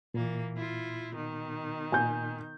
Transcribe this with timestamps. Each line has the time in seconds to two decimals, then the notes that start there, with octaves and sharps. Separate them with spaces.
0.14 A#2 E3 A#3
0.56 E4 F4
1.15 B2 D#3
1.92 A#2 G#5 G6